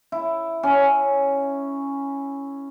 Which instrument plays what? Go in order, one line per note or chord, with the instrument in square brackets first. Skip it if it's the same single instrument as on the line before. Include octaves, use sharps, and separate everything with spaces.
[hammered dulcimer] E4
C#4